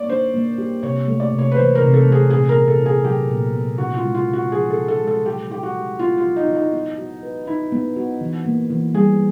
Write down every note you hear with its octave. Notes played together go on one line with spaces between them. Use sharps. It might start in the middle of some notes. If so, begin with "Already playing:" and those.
Already playing: A#3 C#5 D5
D4 C5
A#3
G4
C3 C#5
A3
D5
C3
C#5
B4
E3 C5
A#4
C3
A4
A3
G#4
A#2 G#4
A#4
B3
A4
E4
G#4
F#3 G4
A#2
B3
C#3 F#4
F4
G#3
F4
C#4
F#4
F3 G#4
A4
C#3
A4
G#3
A4
F#3 G4
E4 G4
F#4
G4
B3 F4
F4
F#3
D#4
E4
D#4
B3
F#4
B4
D#4 E4
B3
F#4
E3
A#3
E3
G3 G#4